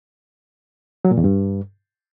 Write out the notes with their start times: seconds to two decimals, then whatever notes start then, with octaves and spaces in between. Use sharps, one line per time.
1.05 F#3
1.11 A#2
1.18 E2
1.24 G2